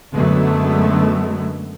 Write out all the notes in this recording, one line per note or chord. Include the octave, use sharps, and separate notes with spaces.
F#2 D3 F#3 G#3 A3 B3